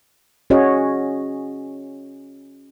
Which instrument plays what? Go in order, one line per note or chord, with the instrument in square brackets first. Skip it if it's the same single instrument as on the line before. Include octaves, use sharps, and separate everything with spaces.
[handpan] C#4 F#4 G#4 C#5 D#5